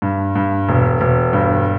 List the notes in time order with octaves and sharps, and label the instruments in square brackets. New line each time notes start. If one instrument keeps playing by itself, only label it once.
[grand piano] G2
G2
E1
E1
G2